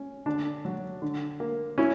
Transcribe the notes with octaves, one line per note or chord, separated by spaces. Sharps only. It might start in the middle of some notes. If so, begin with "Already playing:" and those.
Already playing: C#4
D3 D4
F#3
D3
A#3
C#4 E4